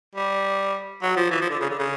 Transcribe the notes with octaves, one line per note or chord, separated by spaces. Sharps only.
G3
F#3
F3
E3
F3
D3
C#3
D3
C#3